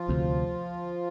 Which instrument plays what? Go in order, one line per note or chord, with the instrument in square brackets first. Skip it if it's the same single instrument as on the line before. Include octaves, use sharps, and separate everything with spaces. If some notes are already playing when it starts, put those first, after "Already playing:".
Already playing: [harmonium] F3 F4
[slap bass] D2 C3